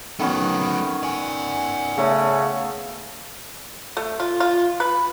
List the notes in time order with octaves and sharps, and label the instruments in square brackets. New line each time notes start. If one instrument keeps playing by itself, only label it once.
[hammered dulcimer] D#3 B3 C#4 [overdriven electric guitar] F#3 A3
[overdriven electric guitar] D5 G#5
[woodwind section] C#3 [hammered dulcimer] A3
[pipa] A3
F4
F4
B4